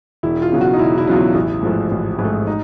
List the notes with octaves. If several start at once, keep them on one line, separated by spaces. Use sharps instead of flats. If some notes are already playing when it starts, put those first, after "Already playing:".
E1 E4
F4
E2 C#3 F#3
F#4
D#4
E1 E4
E4
E2 C#3 F#3 F4
E4
A1
G#2 F3 A3
A1
G#2 F3 A3
D#4